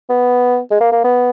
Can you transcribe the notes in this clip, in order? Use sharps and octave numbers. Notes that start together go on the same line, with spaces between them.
B3
G#3
A#3
A#3
B3